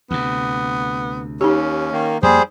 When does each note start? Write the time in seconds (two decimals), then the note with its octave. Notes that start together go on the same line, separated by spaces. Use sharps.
0.11 D2 C3 B3
1.41 D#2 C#4 D#4 G4
1.92 D#3 A#3
2.23 F2 G3 A#3 G#4 C5